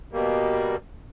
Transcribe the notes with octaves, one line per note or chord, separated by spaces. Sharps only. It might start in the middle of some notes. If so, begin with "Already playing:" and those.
B2 G3 A#3